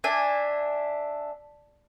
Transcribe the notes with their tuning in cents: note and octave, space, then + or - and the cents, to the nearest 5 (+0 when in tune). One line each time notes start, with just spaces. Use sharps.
D4 +0 E5 +0 G#5 -15